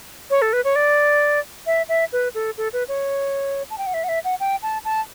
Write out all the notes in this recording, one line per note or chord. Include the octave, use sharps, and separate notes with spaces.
C#5
A4
B4
C#5
D5
E5
E5
B4
A4
A4
B4
C#5
A5
G5
F#5
E5
F#5
E5
F#5
G5
A5
A5